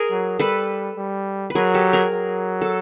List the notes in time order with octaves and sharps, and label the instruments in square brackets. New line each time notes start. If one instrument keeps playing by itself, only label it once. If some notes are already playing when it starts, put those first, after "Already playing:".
Already playing: [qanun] G#4 A#4
[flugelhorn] F#3
[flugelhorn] G3 [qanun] A4 B4
[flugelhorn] G3
[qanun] B4
[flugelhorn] F#3 [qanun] G#4 A#4
[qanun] G4 A4
G#4 A#4
[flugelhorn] F#3
[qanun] A4